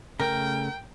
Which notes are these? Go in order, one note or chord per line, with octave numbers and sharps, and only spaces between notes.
C#3 A3 A#4 G5 F6